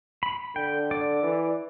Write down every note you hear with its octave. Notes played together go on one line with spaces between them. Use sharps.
B5
D3 G5
D5
E3